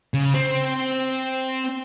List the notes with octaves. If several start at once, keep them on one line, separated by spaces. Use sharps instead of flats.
C#3
C4